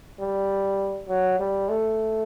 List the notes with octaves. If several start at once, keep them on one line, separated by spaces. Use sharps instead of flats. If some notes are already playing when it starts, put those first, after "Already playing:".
G3
F#3
G3
A3